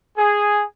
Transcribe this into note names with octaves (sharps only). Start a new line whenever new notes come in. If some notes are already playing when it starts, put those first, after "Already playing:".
G#4